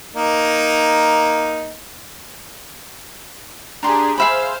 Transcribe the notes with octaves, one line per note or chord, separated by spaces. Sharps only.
A#3 D#4
D4 G4 G#4 A#5 C6
G#4 C5 E5 F5 B5